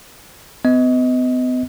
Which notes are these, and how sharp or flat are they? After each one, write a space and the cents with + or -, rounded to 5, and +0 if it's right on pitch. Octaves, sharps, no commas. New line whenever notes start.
B3 +40 D#5 +20